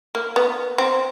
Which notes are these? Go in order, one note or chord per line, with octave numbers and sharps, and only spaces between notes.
A#3
B3
C4